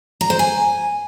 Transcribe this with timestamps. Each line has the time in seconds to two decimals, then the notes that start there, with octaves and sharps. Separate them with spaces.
0.21 A#5
0.30 C5
0.39 G#5